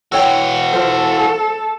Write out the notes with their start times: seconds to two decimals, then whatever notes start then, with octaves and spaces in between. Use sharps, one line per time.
0.12 E3 F#4 A4 C#5 G5
0.73 F4 A4 C5